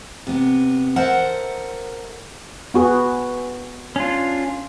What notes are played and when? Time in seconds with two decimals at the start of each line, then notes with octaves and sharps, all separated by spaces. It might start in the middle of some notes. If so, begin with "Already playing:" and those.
0.27 C3 B3
0.96 A4 A#4 C5 E5 F#5 A#5
2.74 B3 F#4 G#4
3.96 C#4 D4 F4